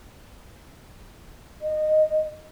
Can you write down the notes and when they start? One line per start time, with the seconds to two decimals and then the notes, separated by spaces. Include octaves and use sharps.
1.61 D#5